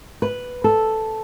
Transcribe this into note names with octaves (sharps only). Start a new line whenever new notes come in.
B4
A4